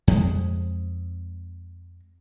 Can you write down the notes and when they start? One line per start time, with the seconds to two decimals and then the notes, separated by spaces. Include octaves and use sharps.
0.08 F2 G#3